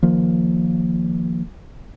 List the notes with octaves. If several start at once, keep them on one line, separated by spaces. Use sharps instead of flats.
D#3 F3 A#3